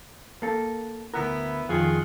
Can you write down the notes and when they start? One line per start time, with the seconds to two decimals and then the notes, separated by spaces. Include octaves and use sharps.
0.42 A#3 A4
1.14 D2 B3 E4 A#4
1.69 F2 D#3 F4 F#4 G#4